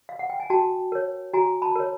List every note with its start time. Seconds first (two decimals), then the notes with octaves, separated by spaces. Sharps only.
0.09 F5
0.19 F#5
0.30 G5
0.40 G#5
0.50 F#4 G5 A5
0.92 A#4 C#5
1.33 F#4 G#5 A#5
1.62 A5 B5
1.76 A#4 C#5